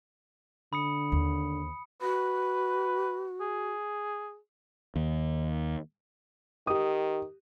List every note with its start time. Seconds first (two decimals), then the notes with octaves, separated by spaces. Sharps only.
0.73 D3 B5 D#6 C#7
1.12 D#2
2.02 F#4 B4
3.41 G#4
4.96 D#2
6.67 D#3 G4 D#6